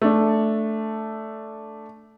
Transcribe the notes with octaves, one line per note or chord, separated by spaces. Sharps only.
A3 D4